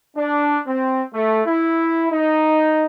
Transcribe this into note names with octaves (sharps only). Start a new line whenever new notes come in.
D4
C4
A3
E4
D#4